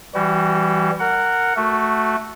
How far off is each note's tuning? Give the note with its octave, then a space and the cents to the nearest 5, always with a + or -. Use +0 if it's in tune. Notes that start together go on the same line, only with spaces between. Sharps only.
E3 +15 G3 +0 F#4 +35
A#4 -15 F#5 +0
A3 +0 F#4 +0